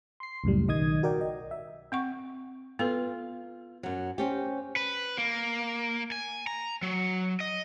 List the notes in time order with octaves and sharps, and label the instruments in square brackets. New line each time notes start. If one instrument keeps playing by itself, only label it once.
[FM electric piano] C6 C7
C#2 F#2 A2 G3
B1 D#3 D#5 D#6 G#6
F#4 A#4 D5 G5
D#5
E5
[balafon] C4 F#5 C#6
[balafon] B3 A4 B4 [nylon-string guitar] F4
[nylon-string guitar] F#2 F#3
C4 C#4 G4
[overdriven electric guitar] B4
A#3
G#5
A#5
F#3
D#5